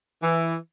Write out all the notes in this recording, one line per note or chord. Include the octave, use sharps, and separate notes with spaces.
E3